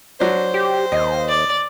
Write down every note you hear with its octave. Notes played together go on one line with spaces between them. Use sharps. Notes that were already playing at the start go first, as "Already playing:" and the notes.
F#3 D4 C5
G4
D#2 D#5
D5